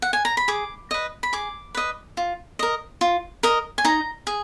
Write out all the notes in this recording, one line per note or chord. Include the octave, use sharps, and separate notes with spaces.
F#5
G#5
A#5
B5
G#4 D6
B4 D#5
B5
G#4 D6
B4 D#5
F4
A#4 D#5
F4
A#4 D#5
G#5
D#4 A#5
G#4